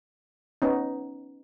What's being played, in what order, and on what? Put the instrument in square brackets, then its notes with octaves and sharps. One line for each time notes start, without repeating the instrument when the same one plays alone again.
[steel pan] B3 C#4 D#4